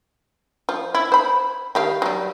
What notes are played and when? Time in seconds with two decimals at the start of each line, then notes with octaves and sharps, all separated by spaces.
0.69 F3
0.95 E4
1.12 C5 B5
1.75 D#3 G4 F5
2.02 F#3 G3